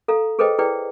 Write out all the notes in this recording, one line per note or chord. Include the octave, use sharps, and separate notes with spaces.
A4 F5 A#5
G#4 A4 B4 C5 D#5 G5
E4 G#4 B4 D5 G5